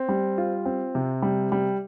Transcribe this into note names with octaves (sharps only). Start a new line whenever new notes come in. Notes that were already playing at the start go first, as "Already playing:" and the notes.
Already playing: C4
G3
F4
C4
C3
G3
G3